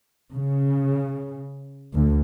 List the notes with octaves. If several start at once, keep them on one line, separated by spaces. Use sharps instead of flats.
C#3
D2